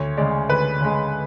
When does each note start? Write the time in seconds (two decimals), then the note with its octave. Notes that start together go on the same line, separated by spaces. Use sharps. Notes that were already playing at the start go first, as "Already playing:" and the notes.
Already playing: D2 C#5
0.17 C#3 G#3 D5
0.49 D2 B4
0.81 C#3 G#3